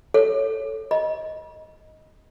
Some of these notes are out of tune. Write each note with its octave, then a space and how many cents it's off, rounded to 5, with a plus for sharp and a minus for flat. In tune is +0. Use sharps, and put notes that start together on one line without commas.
A4 +0 C#5 +0
D#5 +0 B5 -45